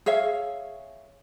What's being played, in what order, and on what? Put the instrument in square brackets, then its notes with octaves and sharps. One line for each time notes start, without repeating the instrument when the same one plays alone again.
[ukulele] G#4 C#5 E5 F5